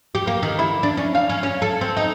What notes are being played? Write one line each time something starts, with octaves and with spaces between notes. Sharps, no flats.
G4
A#3
D#3
E4
D4
C#4
F5
C#4
C#4
A4
C4
D#4